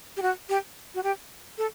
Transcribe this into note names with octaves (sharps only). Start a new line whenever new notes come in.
G4
F#4
G4
F#4
G4
A4